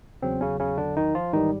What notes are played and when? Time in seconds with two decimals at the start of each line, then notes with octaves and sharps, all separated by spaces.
0.22 E2 C#3 F#3 C4
0.41 C#3 C#4
0.60 C#3 C#4
0.78 D3 D4
0.97 D#3 D#4
1.15 F3 F4
1.33 G#2 D#3 E3 G3 D#4